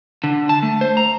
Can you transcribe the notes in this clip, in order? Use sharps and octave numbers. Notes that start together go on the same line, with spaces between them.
D3
A5
A3
C5
A#5